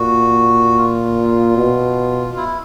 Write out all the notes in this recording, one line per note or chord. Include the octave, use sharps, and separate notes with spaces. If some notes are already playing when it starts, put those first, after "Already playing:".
Already playing: A#2 F#4
F4
B2
E4